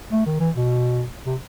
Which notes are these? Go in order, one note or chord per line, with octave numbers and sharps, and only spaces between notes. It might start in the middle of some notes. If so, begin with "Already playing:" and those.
A3
D#3
E3
B2
C3